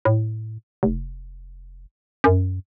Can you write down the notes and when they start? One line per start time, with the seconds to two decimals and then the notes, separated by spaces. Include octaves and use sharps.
0.05 A2
0.83 F1
2.24 F#2